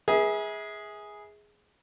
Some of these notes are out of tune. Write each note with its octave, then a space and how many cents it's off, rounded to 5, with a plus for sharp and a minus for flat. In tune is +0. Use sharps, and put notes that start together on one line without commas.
G#4 +0 B4 -45 E5 -35